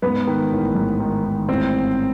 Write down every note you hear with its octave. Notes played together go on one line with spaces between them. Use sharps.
G#2 B3 B4
D#3
A1
G#2
D#3
D#3
A1 C4 C5